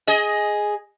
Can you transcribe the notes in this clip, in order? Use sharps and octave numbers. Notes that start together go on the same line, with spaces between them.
G#4 D#5